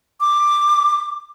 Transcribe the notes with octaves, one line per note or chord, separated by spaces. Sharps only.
D6